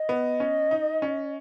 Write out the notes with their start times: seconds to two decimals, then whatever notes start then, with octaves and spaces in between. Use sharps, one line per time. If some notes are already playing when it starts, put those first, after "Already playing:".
Already playing: D#5
0.09 B3
0.40 C#4
0.71 D#4
1.02 C#4